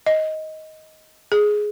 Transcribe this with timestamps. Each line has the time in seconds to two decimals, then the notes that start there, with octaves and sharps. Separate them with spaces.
0.06 D#5
1.32 G#4